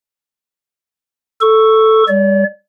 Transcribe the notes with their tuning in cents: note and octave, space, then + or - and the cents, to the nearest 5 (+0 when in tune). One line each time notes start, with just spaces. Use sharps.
A4 +0 C#6 +0
G3 +30 D5 -45